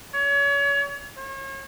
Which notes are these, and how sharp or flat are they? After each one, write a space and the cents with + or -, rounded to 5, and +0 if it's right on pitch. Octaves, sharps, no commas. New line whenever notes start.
C#5 +35
C#5 -40